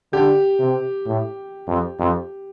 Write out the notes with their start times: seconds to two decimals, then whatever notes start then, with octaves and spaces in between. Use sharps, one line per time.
0.13 D3 G4
0.59 C3
1.06 A2
1.67 F2
1.99 F2